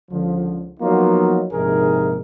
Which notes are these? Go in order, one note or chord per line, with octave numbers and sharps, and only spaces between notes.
C#2 D3 F3
F3 F#3 A#3 B3 D#4 F4
A#1 G#2 C3 D#4 G#4 A#4